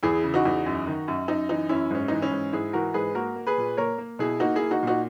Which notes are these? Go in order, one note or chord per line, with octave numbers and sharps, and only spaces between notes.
E2 E4 G#4
C#3
D#4 F#4
E2
F#2
D#3
F#2
F#2 D#4
E3 D#4
F#2 C#4 E4
G#2 C#4
E3 D#4
C#4 E4
G#2
G#2 E4 G#4
E3 F#4 A#4
G#2 G#4 B4
A#3 F#4 A#4
A#3
G#4 B4
A#2
A#3 A#4 C#5
A#3
B2 E4 G#4
A#3 D#4 F#4
E4 G#4
A#3
D#4 F#4
A#2 D#4 F#4